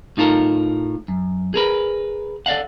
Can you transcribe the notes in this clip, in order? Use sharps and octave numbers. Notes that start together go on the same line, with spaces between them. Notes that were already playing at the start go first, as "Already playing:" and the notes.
A2 D#4 F4 A4 A#4
F#2
G#4 A#4 B4
A4 D5 D#5 F5 F#5